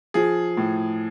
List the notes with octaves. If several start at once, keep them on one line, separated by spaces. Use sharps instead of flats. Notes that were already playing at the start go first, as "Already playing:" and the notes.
F3 G#4
A2